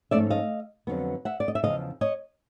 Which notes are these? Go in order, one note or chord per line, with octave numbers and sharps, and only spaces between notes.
G#2 F3 A3 C#4 D5 E5
D#5 F5
F2 D3 F#3 B3
E5 F#5
D5
D#5
E5
E2 C#3 F3 D#5 F5
C#5 D#5